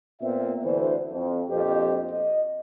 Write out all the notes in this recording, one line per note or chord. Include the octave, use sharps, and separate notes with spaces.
A#2 B3 C4 E5
D2 E3 C5
F2
A#1 F2 B2 G4 C5 D#5
D#5